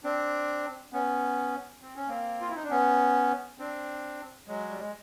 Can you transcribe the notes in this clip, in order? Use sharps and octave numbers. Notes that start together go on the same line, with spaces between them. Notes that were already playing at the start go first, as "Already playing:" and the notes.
C4 D4
B3 C#4
C4
C#4
A#3 C4
F4
E4
D#4
D4
B3 C#4
C4 D4
F#3 G#3
G3
G#3